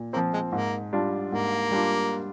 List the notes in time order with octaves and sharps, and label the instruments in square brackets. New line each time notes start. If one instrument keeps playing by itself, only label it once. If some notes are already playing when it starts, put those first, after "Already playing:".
Already playing: [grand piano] A#2
[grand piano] F3 C4 [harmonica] A#3
[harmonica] G#3
[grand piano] G#2 [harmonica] A#3
[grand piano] G3 D4 F4
[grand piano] G#2 [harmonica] A#3
[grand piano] G3 D4 F4